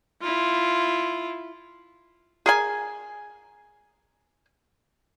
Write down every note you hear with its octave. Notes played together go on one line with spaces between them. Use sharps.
E4 F4
G#4 A#4 G#5